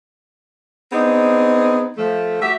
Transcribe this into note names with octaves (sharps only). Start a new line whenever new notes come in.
B3 C4 D4 D#4 G#4
F3 A3
F#4 G4 E5